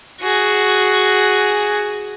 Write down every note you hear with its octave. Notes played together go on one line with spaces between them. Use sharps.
F#4 G#4